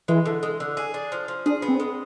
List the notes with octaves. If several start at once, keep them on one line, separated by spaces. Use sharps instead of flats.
E3 G#3
D3
G#3
D3
G#4
D4
F3
F3
D4 G#4
B3
C4
G#3